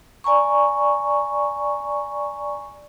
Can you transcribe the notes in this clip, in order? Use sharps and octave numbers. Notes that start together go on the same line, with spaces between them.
D5 G#5 A#5 C#6